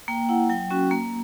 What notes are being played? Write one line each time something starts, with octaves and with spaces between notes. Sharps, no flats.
A#3 G5
E4 F#5
F#3 G5
C#4 F#4
A#3